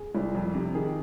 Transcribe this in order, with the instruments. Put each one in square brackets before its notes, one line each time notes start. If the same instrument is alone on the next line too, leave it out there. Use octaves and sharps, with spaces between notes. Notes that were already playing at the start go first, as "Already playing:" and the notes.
Already playing: [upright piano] G#4
C2
F2
C3
D#3 G#4